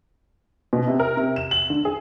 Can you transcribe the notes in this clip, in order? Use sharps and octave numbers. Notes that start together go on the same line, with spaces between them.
B2
C3
A#4
C3
E7
F#7
D3
G#4